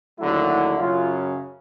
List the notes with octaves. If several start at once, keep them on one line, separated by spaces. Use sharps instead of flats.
D#2 D3 F#3 A3 E4
E4
F#2 C#3 F#3 F4